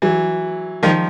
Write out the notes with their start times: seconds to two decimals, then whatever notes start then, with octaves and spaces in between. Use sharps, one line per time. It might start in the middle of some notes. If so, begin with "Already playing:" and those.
0.02 E3 F#3
0.83 D#3 F3